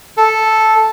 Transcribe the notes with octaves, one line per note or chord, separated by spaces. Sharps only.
A4